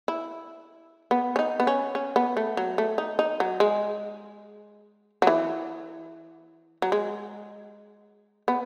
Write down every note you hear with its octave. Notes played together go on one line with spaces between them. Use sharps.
E4
B3
C#4
D#4
B3
C#4
C#4
B3
A3
F#3
A3
D#4
D#4
F#3
G#3
F#3
E3
F#3
G#3
B3